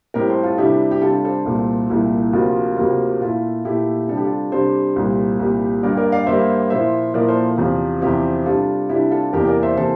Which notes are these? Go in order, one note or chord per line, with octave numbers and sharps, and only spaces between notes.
A2 G3 C4 G4 A#4
A4 C5
F4 A4
C3 G3 D4 E4 G4
G4
C3 G3 D4 F4 A4
A4 C5
C2 A#2 A3
C2 A#2 A3 E4
D2 C3 F3 A#3 F4
D2 C3 F3 A#3
A#2 A3 E4 F4
A#2 A3 E4 G4
C3 G3 D4 A4
G4
F4 A4
C3 G3 D4 A4 C5
C2 A#2 G3
C2 A#2 G3
G2 D3 G3 A#3 A#4 D5
A#4 D5
D5 F5
G2 D3 G3 A#3 C5 E5
A#2 F3 A#3 E4 C5 E5
A#2 F3 A#3 E4 A#4 D5
A4 C5
E2 C3 F3 C4
E2 C3 F3 C4 E4 G4
C3 G3 D4 F4 A4
C3 G3 D4 E4 G4
F4 A4
E2 C3 E3 A#3 G4 A#4
A#4 D5
C5 E5
C3 E3 A#3 A4 C5